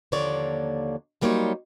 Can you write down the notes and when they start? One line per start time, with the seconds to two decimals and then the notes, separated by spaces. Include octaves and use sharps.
0.12 D#2 D3 F3 A#3 C#5 D5
1.21 F#3 G3 A#3 D#4 C5 C#5